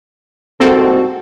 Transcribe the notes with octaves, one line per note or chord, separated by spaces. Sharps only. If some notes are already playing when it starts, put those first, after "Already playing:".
C2 G#2 A#3 C4 F#4 A4